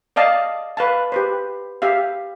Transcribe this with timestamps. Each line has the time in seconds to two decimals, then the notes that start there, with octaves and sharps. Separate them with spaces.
0.16 D5 D#5 F5 A5
0.77 B4 F5 A5
1.12 G4 B4 C5
1.82 G4 E5 F5